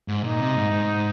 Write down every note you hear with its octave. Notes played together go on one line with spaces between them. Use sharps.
G#2
A#2 D#4
C3
G#2
G#2